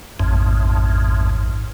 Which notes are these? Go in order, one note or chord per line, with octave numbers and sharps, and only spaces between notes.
A1 F2 G#2